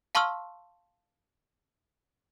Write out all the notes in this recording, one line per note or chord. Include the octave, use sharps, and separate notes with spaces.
F5 A5 C6 C#6 E6 F6